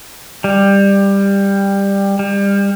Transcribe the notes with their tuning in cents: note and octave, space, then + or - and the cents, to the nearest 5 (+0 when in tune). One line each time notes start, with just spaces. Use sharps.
G3 +15
G3 +30